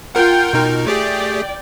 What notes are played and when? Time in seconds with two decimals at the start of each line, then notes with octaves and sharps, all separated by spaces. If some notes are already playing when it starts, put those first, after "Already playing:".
0.15 F4 A#4 F#5 G5
0.53 B2 D#4 A#4
0.87 A3 G4 G#4 D5 G5